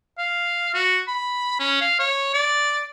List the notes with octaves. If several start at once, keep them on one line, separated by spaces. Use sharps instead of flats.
F5
F#4
B5
C#4
F5
C#5
D5